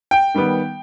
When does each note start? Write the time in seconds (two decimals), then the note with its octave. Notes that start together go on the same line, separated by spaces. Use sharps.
0.11 G5
0.35 D#3 G3 B3